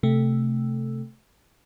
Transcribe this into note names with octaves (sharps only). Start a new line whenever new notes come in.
C3 A3